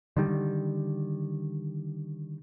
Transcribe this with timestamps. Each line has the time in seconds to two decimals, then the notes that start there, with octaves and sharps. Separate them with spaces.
0.17 D3 D#3 G3